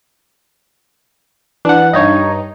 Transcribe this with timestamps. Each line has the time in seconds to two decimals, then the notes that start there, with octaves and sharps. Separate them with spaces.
1.65 E3 D4 F#5
1.93 G2 D#4 C#5 D#5